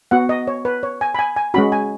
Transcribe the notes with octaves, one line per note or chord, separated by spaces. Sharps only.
B3 F#4 F#5
D#5
C#5
B4
C#5
G#5
B5
G#5
G#5
G#3 C#4 F#4 B5
G#5